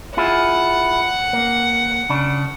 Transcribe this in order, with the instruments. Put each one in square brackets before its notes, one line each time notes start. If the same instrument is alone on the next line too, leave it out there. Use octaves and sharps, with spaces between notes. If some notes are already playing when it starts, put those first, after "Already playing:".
[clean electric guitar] E4 F4 G#4 [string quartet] F#5
[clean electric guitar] A#3
C#3 D4